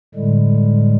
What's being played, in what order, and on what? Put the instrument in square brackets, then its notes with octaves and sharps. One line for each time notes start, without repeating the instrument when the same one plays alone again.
[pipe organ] A2 D3 G3 G#3